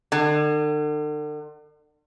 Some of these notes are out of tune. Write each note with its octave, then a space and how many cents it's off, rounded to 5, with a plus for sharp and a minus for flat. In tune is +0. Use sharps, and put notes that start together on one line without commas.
D3 +40